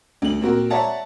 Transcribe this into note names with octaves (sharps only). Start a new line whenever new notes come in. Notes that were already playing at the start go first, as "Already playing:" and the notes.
D2 F#7
A#2 C4 F#4 A#4
C#5 D5 E5 F#5 A5 A#5